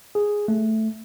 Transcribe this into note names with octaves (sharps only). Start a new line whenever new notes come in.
G#4
A3